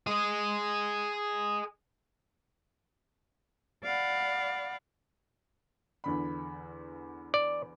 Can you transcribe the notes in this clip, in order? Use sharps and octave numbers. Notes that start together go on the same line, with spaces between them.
G#4 D#5
D5 F5 F#5 B5
E2 D3 B5
D5